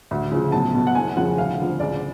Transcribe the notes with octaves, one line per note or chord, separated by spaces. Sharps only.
D2
C#3 F3
B1 A5
B2
F#5
F#1 G#5
F2 C#3 F3 F#5
D2 F5
D3 F3
C#2 D5